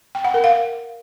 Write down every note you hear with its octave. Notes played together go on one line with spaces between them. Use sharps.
G5
F#5
A#4
F5